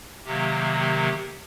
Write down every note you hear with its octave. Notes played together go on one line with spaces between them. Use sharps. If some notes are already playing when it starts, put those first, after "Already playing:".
C3 D#3 F#3 A#3 G4
G4